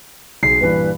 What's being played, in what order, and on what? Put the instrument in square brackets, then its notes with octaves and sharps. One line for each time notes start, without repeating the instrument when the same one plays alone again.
[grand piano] B1 G#4 [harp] C7
[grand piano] G2 A#2 E3 [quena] B4